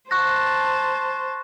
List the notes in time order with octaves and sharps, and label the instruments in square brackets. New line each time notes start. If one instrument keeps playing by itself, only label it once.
[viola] C5 A5 [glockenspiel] C#6 F#6 A#6